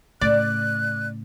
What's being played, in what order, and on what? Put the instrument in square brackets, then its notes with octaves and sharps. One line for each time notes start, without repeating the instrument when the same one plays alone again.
[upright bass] A2 C#3 [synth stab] D5 [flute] F#6